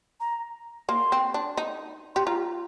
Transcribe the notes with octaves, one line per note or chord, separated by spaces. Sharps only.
A#5
A#3 C6
C4
D4
D#4
G4 C6
F4 A#5